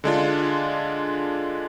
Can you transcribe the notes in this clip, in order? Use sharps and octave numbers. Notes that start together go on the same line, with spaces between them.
D3 G#3 D4 F4